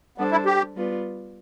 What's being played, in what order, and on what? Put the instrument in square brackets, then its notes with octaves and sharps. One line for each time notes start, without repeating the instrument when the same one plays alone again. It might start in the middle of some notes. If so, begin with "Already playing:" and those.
[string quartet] G3 D4 A4 C5 [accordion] B3
[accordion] E4
G4
[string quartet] G3 B3 F4 B4 D5